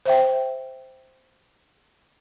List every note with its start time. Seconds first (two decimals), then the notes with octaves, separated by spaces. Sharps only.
0.06 C5 E5 G5